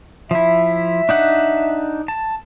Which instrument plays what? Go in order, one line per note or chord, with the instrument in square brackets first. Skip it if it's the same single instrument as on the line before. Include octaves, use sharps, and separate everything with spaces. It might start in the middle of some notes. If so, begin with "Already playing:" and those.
[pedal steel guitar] F3 E4 [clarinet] E5
[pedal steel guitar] D4 D#4 F#5
A5